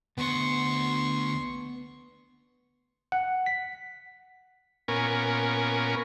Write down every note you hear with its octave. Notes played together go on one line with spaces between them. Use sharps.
D2 B3 F#5 C6 C#6
F#5
B6
A#2 B3 C#4 A#4 G#5